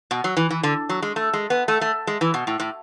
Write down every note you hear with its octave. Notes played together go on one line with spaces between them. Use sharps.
B2
F#3
E3
E3
D3
F#3
G#3
A3
G#3
B3
A3
A3
G#3
E3
B2
A2
A2